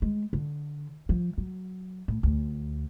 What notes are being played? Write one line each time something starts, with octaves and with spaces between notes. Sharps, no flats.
G#3
D3
F3
F#3
A2
D2